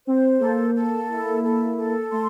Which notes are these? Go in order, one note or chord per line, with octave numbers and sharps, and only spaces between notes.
C4 C5
A#3 A4
A4
E4
A4
A4
A3 C6